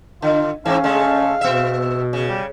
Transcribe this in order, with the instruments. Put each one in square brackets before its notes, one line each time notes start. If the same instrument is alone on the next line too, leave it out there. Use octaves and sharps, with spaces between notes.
[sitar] D3 [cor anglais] F4
[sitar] G#2 E3 [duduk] C#4 [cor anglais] F5
[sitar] C#3 G#3 A3
[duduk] B2 [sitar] B3 E5
[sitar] C#3
[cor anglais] G3